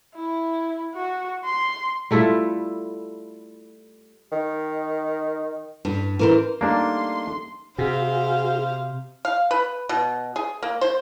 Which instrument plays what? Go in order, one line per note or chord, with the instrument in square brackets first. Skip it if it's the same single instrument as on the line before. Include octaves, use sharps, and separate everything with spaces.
[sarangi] E4
F#4
C6
[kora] G3 A3 E4 F4
[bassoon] D#3
[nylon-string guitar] G2
E3 A#4 C5
[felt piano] G3 A3 D#4 [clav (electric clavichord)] A#3 D4 [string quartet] C6
[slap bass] C3 [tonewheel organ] F#4 G#4 [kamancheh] C5 F5
[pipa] F5
B4
B2
G#4
A#3
C5